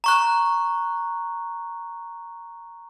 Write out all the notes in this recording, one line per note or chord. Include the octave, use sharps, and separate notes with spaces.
A#5 C#6 F#6